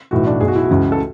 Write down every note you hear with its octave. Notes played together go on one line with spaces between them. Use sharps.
B1 A2 E3 F#4
D4
B1 B2 G#4
F#4
E4
F#4
C#2 C#3 E3
A4